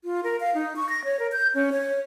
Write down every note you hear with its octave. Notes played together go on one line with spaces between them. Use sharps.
F4
A#4
F5
D#4
C#6
A#6
C#5
A#4
G6
C#4
C#5